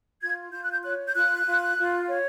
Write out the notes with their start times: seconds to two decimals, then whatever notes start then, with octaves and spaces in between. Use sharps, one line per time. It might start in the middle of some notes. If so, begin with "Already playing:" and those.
0.22 F4 G#6
0.53 F4 G6
0.63 F#6
0.71 G6
0.84 C#5 F#6
1.09 G6
1.15 F4 F#6
1.46 F4
1.78 F4
2.09 C#5